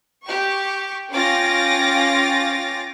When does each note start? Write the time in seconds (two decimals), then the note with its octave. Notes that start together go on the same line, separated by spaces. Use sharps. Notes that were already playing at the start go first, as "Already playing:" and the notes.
0.24 G4 C#6
1.13 C#4 F4 G5 D6 A6 A#6